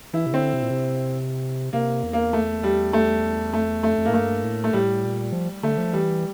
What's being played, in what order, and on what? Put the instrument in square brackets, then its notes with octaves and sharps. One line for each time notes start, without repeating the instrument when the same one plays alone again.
[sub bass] E3 [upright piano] E4
[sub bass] C3
[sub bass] D3 [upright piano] C4
[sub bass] C3
A#2
C3
[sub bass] C3 [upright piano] A#3
[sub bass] E2
[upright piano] A#3
A3
G3
A3
[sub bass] F2 [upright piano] A3
[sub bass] E2
[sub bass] F2 [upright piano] A3
[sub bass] F2
[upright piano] A#3
[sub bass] A2
[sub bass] G2 [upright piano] A3
[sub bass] A2
[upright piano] A3
[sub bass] A2 [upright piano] G3
[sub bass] A#2
F3
[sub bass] D3 [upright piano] A3
[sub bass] F3
[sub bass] E3 [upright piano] G3